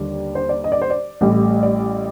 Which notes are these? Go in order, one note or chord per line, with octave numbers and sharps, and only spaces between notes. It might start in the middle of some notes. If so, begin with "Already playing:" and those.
Already playing: D#2 D3 G3 D5
C5
D5
D#5
D5
C5
D5
A1 A2 G3
D5